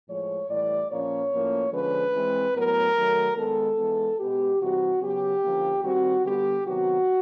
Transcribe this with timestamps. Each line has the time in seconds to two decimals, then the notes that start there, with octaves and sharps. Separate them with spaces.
0.08 A2 F3 G#3 C#5
0.49 A2 E3 G3 D5
0.90 A#2 F3 A#3 C#4 C#5
1.32 A2 F3 A#3 C#4
1.72 D3 F3 G#3 C#4 B4
2.14 E3 G#3 C4
2.55 A2 F#3 B3 A#4
2.96 D#3 F#3 A3
3.36 D#3 G#3 B3 A4
3.78 E3 G#3 B3
4.19 B2 G#3 B3 G4
4.60 C3 E3 G3 C4 F#4
5.01 C#3 F#3 B3 G4
5.43 D3 F3 A#3 C#4
5.83 D#3 G3 C4 F#4
6.24 D3 G3 B3 G4
6.66 C3 D#3 F#3 B3 F#4